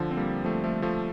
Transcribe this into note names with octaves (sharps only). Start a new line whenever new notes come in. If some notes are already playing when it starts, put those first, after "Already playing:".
Already playing: D3 F3
C4
G3 A#3
F3 A3
F3 A3
F3 A3